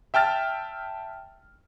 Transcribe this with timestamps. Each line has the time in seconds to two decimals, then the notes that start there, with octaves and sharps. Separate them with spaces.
0.14 E5 G5 A5 F6 A6